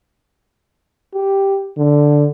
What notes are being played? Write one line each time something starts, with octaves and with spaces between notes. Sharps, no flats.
G4
D3